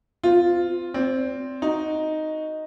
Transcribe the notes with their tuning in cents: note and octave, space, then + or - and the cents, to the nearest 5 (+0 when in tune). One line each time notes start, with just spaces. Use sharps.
C4 -35 F4 +0
C4 +0 D5 -35
D#4 +0 F#4 +0